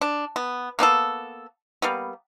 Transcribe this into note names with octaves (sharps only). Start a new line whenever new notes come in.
D4
B3
A#3 B3 D4 A4
G3 A#3 B3